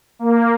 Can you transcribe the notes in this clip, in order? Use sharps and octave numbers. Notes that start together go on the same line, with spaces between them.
A#3